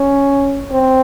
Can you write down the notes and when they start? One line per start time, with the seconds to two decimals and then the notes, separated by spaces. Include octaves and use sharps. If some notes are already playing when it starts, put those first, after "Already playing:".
Already playing: C#4
0.72 C4